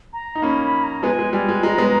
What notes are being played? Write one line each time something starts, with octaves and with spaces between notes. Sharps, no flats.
A#5
D#4
A#3 C#4 B5
B5
A#5
G#3 B3 G#5
G#3
G3 G#5
G#3
G#3 A#5
G#3 B3